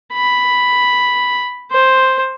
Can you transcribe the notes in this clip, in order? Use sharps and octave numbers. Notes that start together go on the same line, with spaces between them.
B5
C5